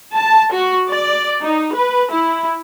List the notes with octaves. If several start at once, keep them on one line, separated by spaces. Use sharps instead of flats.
A5
F#4
D5
D#4
B4
E4